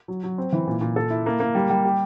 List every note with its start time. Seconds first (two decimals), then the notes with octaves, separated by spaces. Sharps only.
0.08 F#3
0.23 F#3
0.38 C4
0.52 E3
0.67 A#2
0.81 A#2
0.96 A4
1.10 E4
1.26 A#3
1.40 A#3
1.55 G3
1.70 G3
1.85 G4